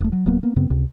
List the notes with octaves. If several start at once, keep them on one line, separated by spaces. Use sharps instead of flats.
E1 A3
F#3
D1 F#3 A#3 B3
A#3 B3
F#2 C#3 B3 C4
C#2 C3